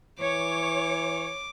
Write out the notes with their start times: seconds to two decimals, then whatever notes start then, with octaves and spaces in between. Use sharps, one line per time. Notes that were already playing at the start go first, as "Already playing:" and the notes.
0.20 E3 C#5 D6